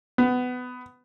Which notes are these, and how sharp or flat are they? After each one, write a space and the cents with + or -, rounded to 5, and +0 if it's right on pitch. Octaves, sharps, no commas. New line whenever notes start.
B3 +20